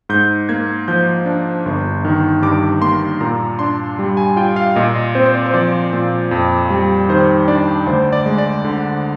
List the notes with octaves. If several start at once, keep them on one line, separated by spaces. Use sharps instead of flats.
G#2 G6
A#3 G#6
F3 G6
D4
G1
D#3
G2 D6
A#3 C6
A#2 A#5
D4 C6
G3
G#5
F4 G5
F5
A#2 D#5
D#5
C4 C5
C5
D5
C5
F3 D5
A#2
F2
G3
D#3 C5
D4 D5
D2 C5
D5
G#3
D5
D3